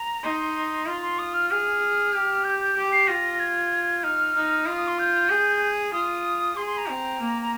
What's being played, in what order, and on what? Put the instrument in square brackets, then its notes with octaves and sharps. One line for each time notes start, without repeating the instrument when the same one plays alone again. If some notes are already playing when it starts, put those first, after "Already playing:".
Already playing: [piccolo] A#5
[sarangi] D#4 [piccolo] C6
[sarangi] F4 [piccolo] C6
[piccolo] C6
D#6
F6
[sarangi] G#4 [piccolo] F6
[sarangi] G4
[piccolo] G6
G6
[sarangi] G4
[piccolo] C7
[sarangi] F4 [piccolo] A#6
[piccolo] G#6
[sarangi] D#4 [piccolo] F6
[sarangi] D#4
[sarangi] F4 [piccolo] D#6
[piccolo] D#6
C6
G6
[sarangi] G#4
[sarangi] F4 [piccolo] D#6
[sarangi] G#4 [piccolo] C6
[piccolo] C6
A#5
[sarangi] C4
A#3
[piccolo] A#5